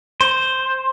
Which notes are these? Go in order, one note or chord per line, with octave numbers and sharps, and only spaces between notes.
C5